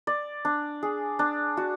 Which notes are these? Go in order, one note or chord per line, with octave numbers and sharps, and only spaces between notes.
D5
D4
G#4
D4
F#4